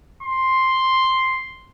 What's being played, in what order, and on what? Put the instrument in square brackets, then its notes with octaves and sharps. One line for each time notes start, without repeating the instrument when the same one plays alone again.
[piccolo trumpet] C6